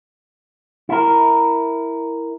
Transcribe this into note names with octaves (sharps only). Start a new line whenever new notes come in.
E4 A#4